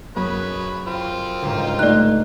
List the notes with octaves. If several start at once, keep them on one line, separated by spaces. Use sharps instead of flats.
F#2 G#4 B4 C#5 B5
C4 F4 G5
G1 C#2 G#2
A3 D#4 D5 F#6